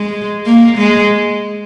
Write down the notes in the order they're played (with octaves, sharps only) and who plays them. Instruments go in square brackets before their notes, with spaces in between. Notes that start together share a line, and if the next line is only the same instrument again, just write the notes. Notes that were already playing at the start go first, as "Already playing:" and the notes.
Already playing: [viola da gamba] G#3
A#3
G#3